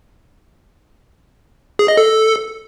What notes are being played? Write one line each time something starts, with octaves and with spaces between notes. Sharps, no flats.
G#4
D#5
A4